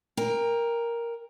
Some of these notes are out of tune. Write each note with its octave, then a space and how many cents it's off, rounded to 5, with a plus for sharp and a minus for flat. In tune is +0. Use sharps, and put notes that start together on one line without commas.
A#4 +5 G5 +35